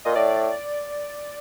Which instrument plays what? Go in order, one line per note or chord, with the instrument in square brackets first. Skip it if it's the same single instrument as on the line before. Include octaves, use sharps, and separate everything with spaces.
[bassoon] A#2 [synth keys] D#5
[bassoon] A2 [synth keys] D5